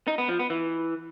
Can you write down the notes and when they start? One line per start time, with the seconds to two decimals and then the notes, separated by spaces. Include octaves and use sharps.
0.08 D#4
0.18 B3
0.29 F3
0.39 B3
0.50 E3